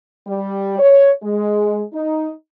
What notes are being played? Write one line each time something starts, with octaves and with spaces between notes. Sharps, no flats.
G3
C#5
G#3
D#4